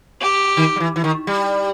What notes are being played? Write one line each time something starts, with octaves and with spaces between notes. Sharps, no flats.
G4
D#3
G3
E3
E3
D#3
G3